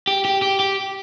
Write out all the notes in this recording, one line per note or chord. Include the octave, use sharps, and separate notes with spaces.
G4
G4
G4
G4